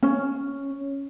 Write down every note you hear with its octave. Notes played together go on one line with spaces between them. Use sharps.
C#4